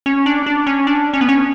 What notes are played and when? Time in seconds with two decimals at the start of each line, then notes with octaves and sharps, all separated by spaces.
0.06 C#4
0.26 D4
0.46 D4
0.67 C#4
0.87 D4
1.13 C#4
1.21 B3
1.29 C#4